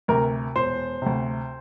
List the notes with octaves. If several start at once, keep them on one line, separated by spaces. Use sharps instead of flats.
D2 C3 A#4
E1 C5
D2 C3